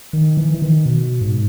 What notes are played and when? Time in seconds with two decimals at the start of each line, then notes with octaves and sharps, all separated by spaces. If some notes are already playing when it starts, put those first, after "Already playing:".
0.13 D#3
0.37 E3
0.54 E3
0.62 D#3
0.86 B2
1.21 G#2